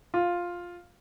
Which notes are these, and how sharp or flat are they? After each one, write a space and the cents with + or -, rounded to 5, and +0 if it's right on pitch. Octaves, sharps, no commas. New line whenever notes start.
F4 +5